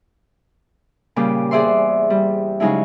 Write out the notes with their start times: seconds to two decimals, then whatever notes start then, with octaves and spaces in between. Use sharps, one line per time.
1.16 A#2 C#3 G3 G4 D6
1.51 E2 G#4 C5 D5 E5 C6
2.10 G3
2.60 C#3 F#3 G#3 D#4 E4